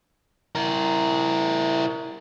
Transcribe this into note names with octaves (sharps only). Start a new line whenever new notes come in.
E4 A#4